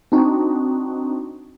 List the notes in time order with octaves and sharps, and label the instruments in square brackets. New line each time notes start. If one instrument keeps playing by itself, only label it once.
[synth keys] C4 D4 D#4 F#4